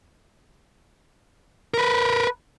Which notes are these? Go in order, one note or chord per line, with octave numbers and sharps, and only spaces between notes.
A#4 B4